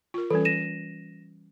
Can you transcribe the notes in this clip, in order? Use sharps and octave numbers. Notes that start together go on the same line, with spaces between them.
F4 A#4
E3 G3 C#4 A4
A#6 D#7 E7